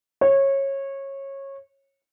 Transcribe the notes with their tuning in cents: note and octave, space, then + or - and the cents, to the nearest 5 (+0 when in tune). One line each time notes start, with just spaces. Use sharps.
C#5 -20